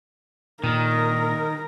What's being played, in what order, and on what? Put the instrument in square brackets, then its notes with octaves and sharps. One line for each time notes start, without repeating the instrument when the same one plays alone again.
[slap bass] A#2 [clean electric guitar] D#3 [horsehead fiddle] A#4